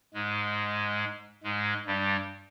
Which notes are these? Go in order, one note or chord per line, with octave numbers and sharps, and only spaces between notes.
G#2 G#3
G#2 G#3
G2 G3